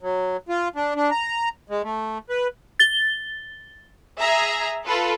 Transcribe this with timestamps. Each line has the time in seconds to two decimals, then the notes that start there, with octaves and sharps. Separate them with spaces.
0.02 F#3
0.49 F4
0.76 D4
0.96 D4
1.11 A#5
1.70 G#3
1.83 A3
2.29 B4
2.80 A6 G7
4.19 G#4 E5 A#5
4.85 F4 A4 B4